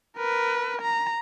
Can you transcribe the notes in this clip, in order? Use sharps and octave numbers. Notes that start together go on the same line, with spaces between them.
A#4 B4
A#5